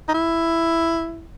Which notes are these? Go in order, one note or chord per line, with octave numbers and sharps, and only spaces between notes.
D#4
E4